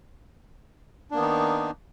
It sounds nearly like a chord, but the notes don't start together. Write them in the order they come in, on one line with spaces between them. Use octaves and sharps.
D4 A#3 B3 D#3 D#4